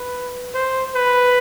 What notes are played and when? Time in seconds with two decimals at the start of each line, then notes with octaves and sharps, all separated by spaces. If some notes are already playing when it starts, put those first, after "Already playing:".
Already playing: B4
0.54 C5
0.95 B4